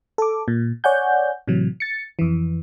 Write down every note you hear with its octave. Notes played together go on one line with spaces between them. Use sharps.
A4 D6
A#2
C#5 D5 F#5 G#5 G6
A2 C3 E3 F#3
A6 C#7
F2 E3